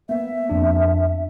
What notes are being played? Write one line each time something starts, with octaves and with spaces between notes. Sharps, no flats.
A#3 B3 E5
F2 D4